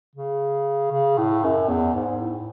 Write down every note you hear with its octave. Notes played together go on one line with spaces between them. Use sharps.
C#3
C#3
A2
F#2
E2
G#2
A2